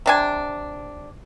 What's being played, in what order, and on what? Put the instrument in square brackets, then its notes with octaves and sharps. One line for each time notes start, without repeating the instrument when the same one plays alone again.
[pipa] C3 D4 G#5